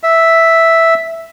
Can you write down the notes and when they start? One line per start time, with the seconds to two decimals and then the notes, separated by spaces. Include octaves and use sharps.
0.03 E5